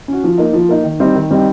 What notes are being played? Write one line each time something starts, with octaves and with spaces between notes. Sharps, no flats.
C#4 F#4
F3
A#3 D#4
F3
A#3 D#4
D#3
G3 C4 D#4
D#3
G3 C4 D#4